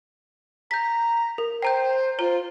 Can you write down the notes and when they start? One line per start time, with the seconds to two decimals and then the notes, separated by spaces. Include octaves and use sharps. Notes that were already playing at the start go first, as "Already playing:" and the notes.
0.71 A#5 G6 B6
1.38 A#4
1.62 C5 G5 A#5 G6
2.19 F4 C5 A#5